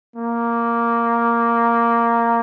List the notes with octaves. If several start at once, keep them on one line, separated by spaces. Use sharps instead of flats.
A#3